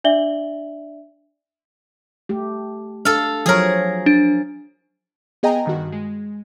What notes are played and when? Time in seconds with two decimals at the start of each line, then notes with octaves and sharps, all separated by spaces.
0.04 D4 D5 E5 F#7 G7
2.29 A3 G4
3.05 D4 A4 F5
3.46 F3 F#3 G#4 A#4 C#5
4.06 D4
5.43 B3 G#4 D#5 G5 G#5 A#5
5.65 G2 D#3 F#4
5.92 G#3